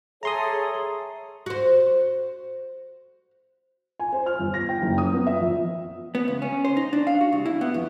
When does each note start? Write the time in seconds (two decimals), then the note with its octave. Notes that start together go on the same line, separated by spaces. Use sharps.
0.23 G#4 A4 C#5 E5 G#5 A#5 C6 D#6
1.46 F#4 C5
4.00 G#5
4.12 C5
4.26 F6
4.39 G1
4.54 A#6
4.69 G5
4.82 F#1
4.98 D#6
5.13 B3
5.27 E5
5.40 A#1
6.15 B3
6.28 C#2
6.42 C#4
6.65 C5
6.77 D#4
6.93 D4
7.07 F5
7.21 F#4
7.33 C2
7.46 E4
7.61 B3
7.74 F2